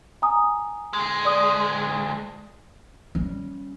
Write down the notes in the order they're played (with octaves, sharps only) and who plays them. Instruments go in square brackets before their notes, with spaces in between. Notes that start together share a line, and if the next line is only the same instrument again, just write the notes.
[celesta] G#5 A#5 D#6
[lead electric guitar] D2 G#3
[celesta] D5 D#6
[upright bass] G3 C#4